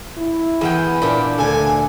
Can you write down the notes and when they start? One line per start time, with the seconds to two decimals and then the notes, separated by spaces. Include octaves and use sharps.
0.18 E4
0.61 E2 B3 G#4 F#5 G5
1.02 A#2 D4 G4
1.38 D2 D3 A4 G#5